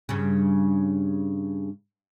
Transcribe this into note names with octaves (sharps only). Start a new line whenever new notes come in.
G2 C#3